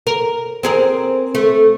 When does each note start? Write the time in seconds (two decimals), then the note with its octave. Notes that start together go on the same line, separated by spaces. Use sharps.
0.07 A#4
0.63 C4 G#4 A#4
1.35 A3